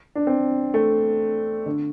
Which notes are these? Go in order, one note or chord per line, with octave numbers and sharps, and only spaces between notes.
D4
C4
A3
D3